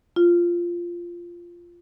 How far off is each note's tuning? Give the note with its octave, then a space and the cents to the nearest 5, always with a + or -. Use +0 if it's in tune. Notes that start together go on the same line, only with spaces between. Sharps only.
F4 -10